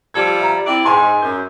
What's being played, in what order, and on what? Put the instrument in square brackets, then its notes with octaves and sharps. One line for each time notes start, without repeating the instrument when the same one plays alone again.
[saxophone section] F3 G3 A4 [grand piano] A5 G#6
[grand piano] E5 A#5
[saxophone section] C4 E4 D5
[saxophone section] G#2 [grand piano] G#5 C6
[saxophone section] F#2 [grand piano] G6